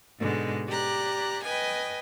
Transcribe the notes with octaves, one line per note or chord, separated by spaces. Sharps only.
G#2 B2 D3 G#3
G4 D5 A#5 F#6
B4 D#5 G5 G#5